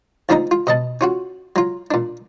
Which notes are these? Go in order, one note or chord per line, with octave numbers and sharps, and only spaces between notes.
D2 F3 D4 D#4 A#5
F4
B2 D#5 A5
C#4 F4 F#4
F#3 F4
A#2 D4